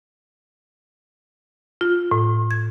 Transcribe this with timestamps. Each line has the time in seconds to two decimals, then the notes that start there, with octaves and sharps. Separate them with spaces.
1.81 F4
2.11 A2
2.51 G#6